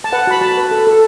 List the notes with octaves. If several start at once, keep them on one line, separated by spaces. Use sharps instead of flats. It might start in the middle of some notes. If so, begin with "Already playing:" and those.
A5
B4 F#5
F#4 B5
F#4 A5
B4
A4
A4